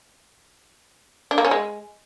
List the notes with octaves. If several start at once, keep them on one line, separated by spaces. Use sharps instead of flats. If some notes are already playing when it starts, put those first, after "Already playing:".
D4
A#3
C#4
G#3